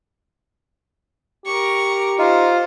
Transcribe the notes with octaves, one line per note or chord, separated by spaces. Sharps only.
G4 A#4 C#6
D#4 F4 C5